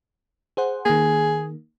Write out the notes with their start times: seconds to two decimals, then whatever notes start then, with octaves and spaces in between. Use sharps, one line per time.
0.57 G#4 C5 F#5
0.86 D#3 A#3 G#4